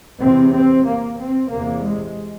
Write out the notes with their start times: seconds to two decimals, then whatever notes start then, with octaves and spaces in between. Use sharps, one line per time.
0.19 E2 C3 C4
0.53 C4
0.86 A#3
1.18 C4
1.51 E2 C3 A#3
1.84 G#3